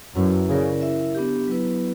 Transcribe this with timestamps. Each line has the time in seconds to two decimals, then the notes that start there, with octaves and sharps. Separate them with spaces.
0.16 F#2 C#4 E4 B4
0.49 C#3 E4 A#4 D5
0.81 E4 A#4 E5
1.15 B3 D4 G4
1.48 F#3 B3 E4 B4